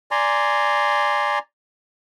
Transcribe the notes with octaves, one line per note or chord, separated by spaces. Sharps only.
D5 G#5 A#5 C6